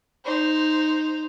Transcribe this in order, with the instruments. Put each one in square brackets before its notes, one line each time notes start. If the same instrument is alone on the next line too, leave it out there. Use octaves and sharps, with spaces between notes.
[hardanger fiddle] D#4 C5